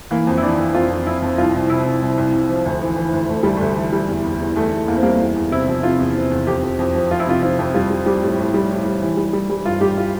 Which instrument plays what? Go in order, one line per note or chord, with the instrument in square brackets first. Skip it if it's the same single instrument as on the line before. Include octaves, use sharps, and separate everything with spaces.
[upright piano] E3 A#3
F2
E4
E3 D4
E3
F2 F4
F2
F2 E4
F2
C2 F4
C2
C3 E4
C2
C2
C2
C2
F3
D2
E3
E3
D2
D2 A3
D2 G3
D2 A3
E3
G3
E2
E2
E2
E2 A3
E2
E2 A#3
C4
G3 A#3
E2
E2
C3 E4
F3
C3 F4
E2
C3
E2
F2 G4
F2
F2
F3
F3 F4
E4
C3 F4
F3 F4
F2
G3 F4
G3
G3 G4
A2
A2
G3
A2
G3
E3
G3
G3
G3
G2 F4
G3 G4
F4